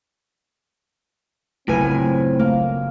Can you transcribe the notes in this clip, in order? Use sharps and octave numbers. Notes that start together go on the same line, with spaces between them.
F#1 A2 C4 F4 B4 G#5
A3 A#3